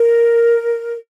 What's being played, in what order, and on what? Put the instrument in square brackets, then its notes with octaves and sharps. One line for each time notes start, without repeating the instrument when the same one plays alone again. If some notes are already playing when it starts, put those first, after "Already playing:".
Already playing: [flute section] A#4